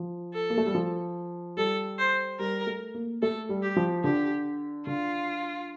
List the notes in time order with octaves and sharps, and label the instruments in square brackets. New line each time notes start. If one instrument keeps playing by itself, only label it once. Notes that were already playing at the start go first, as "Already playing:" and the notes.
Already playing: [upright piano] F3
[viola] A4
[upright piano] A#3
A3
G3
F3
[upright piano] G3 [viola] A4
[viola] C5
[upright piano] G3 [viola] A#4
[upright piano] A3
A#3
[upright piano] A3 [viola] A4
[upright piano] G3
[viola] G4
[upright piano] F3
[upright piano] D3 [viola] G4
[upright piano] D3 [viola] F4